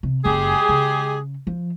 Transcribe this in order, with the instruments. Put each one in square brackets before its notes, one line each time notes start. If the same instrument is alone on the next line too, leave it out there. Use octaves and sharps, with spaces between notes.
[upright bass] C3
[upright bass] F#1 F#2 [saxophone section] G#3 G4 G#4
[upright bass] C#3
F3